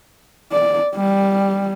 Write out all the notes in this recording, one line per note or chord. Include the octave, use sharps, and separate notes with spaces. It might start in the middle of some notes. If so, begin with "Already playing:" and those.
D5
G3